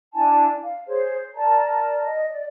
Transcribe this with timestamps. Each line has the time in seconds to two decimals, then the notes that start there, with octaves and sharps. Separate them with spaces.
0.14 D4 E4 G#5 A5
0.63 F5
0.87 G#4 C5 C#5
1.34 A#4 D5 A5 A#5
2.03 D#5
2.30 D5